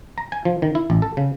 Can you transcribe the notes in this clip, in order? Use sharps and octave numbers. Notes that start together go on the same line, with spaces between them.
A#5
G#5
F3
D#3
E4
A1
A4
C#3